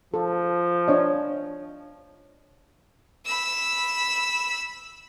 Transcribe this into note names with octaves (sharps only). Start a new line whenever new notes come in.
F3 A4
D4 C#5 D#5
B5 E6